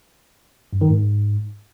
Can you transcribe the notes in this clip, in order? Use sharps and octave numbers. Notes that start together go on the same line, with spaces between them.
G2
D#3
G#2